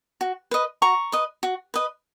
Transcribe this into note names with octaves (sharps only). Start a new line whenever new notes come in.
F#4
B4 D#5
F#4 A#5 C#6
B4 D#5
F#4
B4 D#5